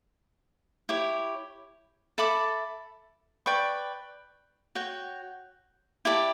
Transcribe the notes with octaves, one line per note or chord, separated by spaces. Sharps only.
E4 G4 C#5
A4 E5 B5 D6
B4 D5 G5 C#6
F#4 C#5 G5
E4 G4 D5 A5